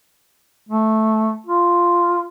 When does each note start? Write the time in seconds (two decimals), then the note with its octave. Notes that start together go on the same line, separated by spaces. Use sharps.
0.69 A3
1.47 F4